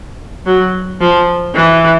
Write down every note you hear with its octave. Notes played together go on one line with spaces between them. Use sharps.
F#3
F3
E3